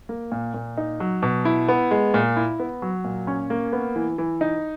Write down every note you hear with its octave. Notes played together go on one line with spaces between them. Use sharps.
A#3
A#2
A#2
D#4
F#3
B2
E4
B3
G#3
A#2
E4
B3
F#3
A#2
C#4
A#3
B3
E3
E3
D#4